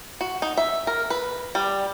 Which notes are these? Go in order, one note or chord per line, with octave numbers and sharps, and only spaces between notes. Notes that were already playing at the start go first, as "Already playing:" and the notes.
F#4
D#4
E5
A#4
B4
G3